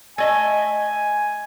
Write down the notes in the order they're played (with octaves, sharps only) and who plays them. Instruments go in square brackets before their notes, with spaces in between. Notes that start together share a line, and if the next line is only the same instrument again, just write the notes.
[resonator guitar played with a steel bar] A3 D#5 E5 [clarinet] G#5